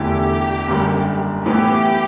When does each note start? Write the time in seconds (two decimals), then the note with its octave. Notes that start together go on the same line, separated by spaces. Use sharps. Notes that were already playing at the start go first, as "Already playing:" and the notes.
Already playing: E1 E2 D3 A3 E4 G4
0.68 F#1 F#2 D3 G3
1.45 A2 E3 B3 E4 G4